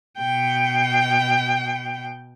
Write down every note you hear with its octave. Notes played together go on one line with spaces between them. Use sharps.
B2 G5